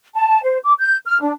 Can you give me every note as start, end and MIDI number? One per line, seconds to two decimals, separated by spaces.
0.15 0.41 81
0.43 0.58 72
0.63 0.73 86
0.79 0.97 91
1.06 1.20 89
1.21 1.33 62